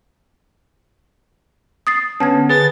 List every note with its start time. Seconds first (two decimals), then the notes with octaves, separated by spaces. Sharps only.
1.87 D#6 A6 C7
2.20 D3 B3 C#4 A5 G#6
2.49 G#4 B4 A6